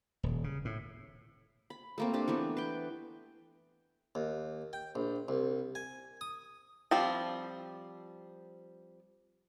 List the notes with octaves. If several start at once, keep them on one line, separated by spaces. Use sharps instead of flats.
D#1
C#3
A2
B5
A3 A#3 C4
A#3 D4 G4
E3 A3 B3
B4 G5
D#2
G5
A#1
C2
G#5
D#6
F3 G3 C4